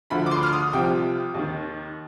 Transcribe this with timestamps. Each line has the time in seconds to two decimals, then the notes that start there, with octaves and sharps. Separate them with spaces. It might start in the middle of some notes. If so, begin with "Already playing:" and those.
0.10 D2 D3 F3 B5
0.26 D6
0.31 C6
0.43 F6
0.52 D#6
0.73 C2 C3 F3 G5
1.34 D#2 D#3